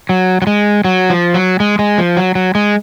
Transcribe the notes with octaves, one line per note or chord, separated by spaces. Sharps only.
F#3
F#3
G#3
F#3
F3
F#3
G#3
G#3
F3
F#3
F#3
G#3